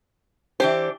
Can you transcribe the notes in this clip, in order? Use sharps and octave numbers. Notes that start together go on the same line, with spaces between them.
E3 D4 G4 C5